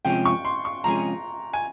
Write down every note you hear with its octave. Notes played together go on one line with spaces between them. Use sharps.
C3 F3 G#3 C#4 G#4 G5
C#6
C6
C#6
C3 F3 G#3 C#4 G#4 A#5
G#5